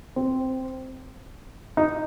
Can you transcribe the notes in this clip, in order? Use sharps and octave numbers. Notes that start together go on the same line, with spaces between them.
C4
D#4